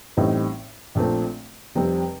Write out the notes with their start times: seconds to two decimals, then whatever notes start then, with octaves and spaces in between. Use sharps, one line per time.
0.17 A1 A2 G3 C4 D#4
0.95 A#1 A#2 A3 C4
1.75 F1 F2 C3 G3 C4